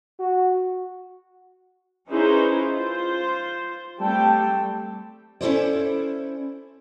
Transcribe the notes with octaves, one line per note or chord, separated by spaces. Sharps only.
F#4
C#4 D#4 E4 G#4 B4 C5
F4 C5
G3 A3 C4 G5 A5
C#4 E4 F4 A4 C5 D5